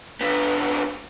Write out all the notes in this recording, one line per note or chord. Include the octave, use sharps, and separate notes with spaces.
D3 B3